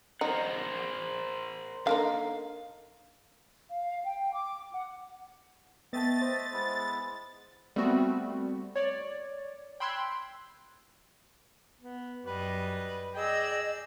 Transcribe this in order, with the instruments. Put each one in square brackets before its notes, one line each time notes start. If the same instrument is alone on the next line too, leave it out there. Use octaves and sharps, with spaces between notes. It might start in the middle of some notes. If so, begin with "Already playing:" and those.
[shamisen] D#4 [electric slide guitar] A#4 C5 F#5
[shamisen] D3 A#3 D#4 [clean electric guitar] F5
[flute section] F5
G5
D6
F#5
[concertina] A3 D#5 E5 [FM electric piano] B3 G5 A5 [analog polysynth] A6
[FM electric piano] C5
[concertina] G#3 B3 E4
[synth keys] G3 A3 B3 C4 F#4
C#5 D5
G5 B5 C6 E6 F#6 G#6
[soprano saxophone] B3
[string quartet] F#2 G3 D#5 [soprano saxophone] B4
[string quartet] G#4 D5 E6 [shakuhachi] D#5 [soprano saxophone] G5